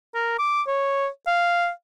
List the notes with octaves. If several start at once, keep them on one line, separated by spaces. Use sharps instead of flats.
A#4
D6
C#5
F5